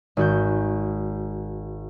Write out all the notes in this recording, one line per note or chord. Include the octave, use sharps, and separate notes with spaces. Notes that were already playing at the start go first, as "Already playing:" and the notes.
G#1 F#4 G6